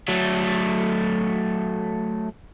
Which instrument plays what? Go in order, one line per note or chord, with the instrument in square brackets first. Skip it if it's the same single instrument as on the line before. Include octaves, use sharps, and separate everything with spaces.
[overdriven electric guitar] F#3 A3